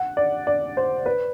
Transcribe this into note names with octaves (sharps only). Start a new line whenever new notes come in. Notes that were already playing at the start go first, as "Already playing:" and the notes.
Already playing: F#5
D5
D5
C5
B4